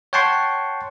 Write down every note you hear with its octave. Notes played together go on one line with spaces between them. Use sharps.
C#5 F#5 G5 A5 C6 C#6